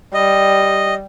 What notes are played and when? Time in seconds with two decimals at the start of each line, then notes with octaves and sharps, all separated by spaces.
0.14 G3 D#5